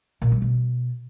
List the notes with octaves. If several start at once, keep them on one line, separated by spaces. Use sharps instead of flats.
A#2
G3
B2